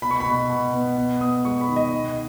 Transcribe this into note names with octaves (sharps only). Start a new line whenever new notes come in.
B2 B5
C#6
B5
B2
B2
B3
B3
B3 D#6
G#3 C#6
B5
D#3
D#5
B2